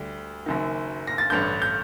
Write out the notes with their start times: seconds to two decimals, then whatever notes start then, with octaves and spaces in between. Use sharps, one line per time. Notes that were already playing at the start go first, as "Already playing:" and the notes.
Already playing: D2 D3 G3
0.46 F#1 F#2 D#3
1.07 A#6
1.18 A6
1.30 A1 G2 D3 G6
1.62 G6